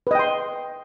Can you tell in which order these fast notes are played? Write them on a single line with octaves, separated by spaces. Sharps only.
B4 D#5 G5 C6